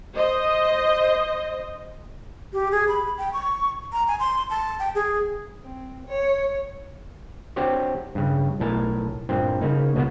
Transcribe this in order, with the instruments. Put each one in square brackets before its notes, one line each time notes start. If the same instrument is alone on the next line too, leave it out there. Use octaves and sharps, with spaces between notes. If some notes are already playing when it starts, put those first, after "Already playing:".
[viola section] C5 D#5
[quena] G4
G#4
B5
G5
C#6
A#5
G#5
C6
A5
G5
G#4
[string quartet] C4
C#5
[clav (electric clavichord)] C4 D4 F#4 G4 C5 C#5
G2 C#3
B1 A2 A4 A#4 G#5 A5
G2 A#2 C4
C#3 A#3 D#4
C#2 B2 A#3 B3 F#4